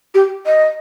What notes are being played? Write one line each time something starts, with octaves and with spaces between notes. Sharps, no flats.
G4
D#5